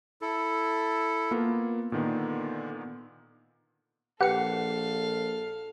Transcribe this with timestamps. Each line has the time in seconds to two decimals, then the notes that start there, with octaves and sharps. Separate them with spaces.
0.22 E4 A4
1.31 A#3 B3 F4
1.92 A#2 D3 D#3 B3
4.21 A#1 G4 A4 B4 F5 F#5 C#7